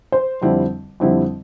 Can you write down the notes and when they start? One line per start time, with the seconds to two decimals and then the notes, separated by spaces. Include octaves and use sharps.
0.12 C5
0.42 F2 D3 G3 C4 E4
1.00 F2 D3 G3 C4 E4